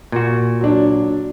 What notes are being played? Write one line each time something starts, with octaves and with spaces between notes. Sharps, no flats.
A#2 F#4
F#3 D4